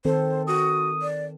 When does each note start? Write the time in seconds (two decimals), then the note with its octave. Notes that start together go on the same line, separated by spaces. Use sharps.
0.05 D#3 C4 A4 C5
0.47 F#4 D#6
1.02 D5